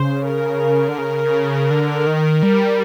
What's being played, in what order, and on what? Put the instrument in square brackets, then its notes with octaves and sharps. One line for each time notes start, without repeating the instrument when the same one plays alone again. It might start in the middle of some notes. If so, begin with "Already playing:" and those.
Already playing: [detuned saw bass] C#3 [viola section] C5
[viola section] A#4
[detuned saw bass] D3
C#3
D3
D#3
G3